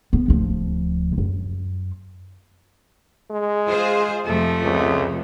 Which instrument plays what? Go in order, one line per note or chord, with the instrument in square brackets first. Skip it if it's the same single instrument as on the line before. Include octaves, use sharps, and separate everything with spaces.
[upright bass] B3
D1 F3
F#2
[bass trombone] G#3
[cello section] F4 G#4 C5
[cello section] F2 C3 F3 [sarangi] A3
[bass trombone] C#2